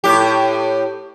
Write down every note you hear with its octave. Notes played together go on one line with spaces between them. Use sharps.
A2 G4